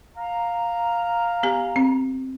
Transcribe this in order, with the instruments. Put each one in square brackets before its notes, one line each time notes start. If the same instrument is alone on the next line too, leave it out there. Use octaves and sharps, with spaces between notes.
[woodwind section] F5 A#5
[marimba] B3 G4 G#5
C4